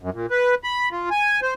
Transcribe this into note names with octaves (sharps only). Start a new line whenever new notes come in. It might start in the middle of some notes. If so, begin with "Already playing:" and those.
F#2
A#2
B4
B5
F4
G#5
C5